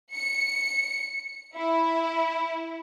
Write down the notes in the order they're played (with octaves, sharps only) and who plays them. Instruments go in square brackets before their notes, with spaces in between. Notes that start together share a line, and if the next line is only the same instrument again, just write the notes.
[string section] C#7
E4